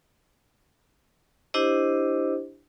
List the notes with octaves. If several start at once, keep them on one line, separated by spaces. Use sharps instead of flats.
D4 E4 G4 C5 D#5